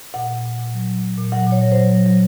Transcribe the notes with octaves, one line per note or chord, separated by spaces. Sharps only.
A#2 F#5
A#2
A#2
A#2
F#3
F#3
F#3
A#2
F#3 F#5
A#2
C#5
F#3
F#3 C5
F#3
F#3